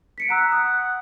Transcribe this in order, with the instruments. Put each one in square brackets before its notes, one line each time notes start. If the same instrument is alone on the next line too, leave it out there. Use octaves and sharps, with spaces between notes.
[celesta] B6 C#7 D7
[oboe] F#5 [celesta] A#5 E6 B6
[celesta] D#6